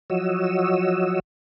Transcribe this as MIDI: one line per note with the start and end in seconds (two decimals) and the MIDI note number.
0.10 1.20 53
0.10 1.20 54
0.10 1.20 66
0.10 1.20 73
0.10 1.20 75
0.10 1.20 88